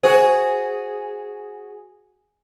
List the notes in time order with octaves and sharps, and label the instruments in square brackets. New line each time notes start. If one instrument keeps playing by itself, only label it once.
[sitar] F#4 G#4 [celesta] C5